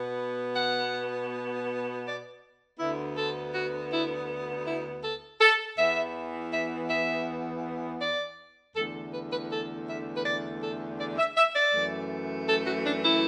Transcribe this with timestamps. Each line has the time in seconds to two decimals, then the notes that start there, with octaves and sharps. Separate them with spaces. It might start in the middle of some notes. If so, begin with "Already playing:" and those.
Already playing: B2 B3
0.56 F#5
2.06 D5
2.79 D2 D3 B3 E4
3.17 A4
3.54 F#4
3.91 E4
4.66 E4
5.04 A4
5.40 A4
5.77 E2 E3 B3 E5
6.52 E5
6.89 E5
8.01 D5
8.75 E2 D3 A3 A4
9.13 B4
9.32 B4
9.50 A4
9.88 E5
10.16 B4
10.25 D5
10.62 A4
10.99 D5
11.18 E5
11.37 E5
11.55 D5
11.73 F#2 E3 A3
12.48 A4
12.67 F#4
12.86 D4
13.04 E4